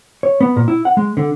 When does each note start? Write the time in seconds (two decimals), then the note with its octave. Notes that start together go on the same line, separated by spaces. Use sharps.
0.23 C#5
0.41 B3
0.56 A#2
0.68 E4
0.85 F#5
0.97 G#3
1.17 D3